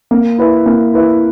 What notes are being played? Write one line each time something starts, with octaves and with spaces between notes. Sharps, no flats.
A#3
E4 B4 E5
A#3
E4 B4 E5